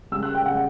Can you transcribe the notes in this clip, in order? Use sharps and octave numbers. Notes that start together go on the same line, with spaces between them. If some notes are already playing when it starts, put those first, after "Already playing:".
C#3 G3 E6
F#6
G5
C#3 G3 F#5